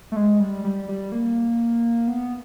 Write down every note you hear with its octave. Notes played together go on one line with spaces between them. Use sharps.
A3
G#3
G3
G3
G3
A#3
B3